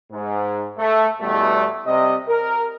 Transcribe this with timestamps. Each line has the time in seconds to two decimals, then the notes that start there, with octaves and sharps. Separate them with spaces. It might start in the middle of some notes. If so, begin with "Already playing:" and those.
0.12 G#2
0.79 A3
1.22 E2 B2 G3 A3
1.86 C3 G3 D#5
2.29 A#4